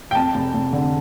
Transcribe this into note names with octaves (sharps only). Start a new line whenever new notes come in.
G5
F2 A5
F1
F1
D3